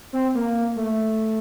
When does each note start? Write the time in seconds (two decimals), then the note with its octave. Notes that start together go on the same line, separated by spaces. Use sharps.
0.13 C4
0.35 A#3
0.76 A3